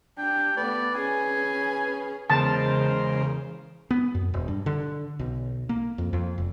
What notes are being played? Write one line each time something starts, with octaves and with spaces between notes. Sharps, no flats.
D4 G4 G5
A3 B3 B4 D5
C#4 G#4 G#5
E2 C#3 G#3 A#4 C5 A5
B3
F#2
E1
G2
D3
B1
A#3
F2
F2
F1